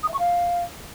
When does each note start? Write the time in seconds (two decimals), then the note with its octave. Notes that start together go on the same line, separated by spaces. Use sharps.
0.03 D#6
0.08 E5
0.14 C#6
0.19 F5